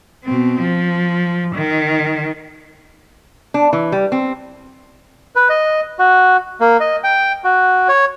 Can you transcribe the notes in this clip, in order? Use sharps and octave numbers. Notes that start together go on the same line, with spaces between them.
B2 C4
F3
D#3
D4
E3
G3
C4
B4
D#5
F#4
A#3
D#5
G5
F#4
C#5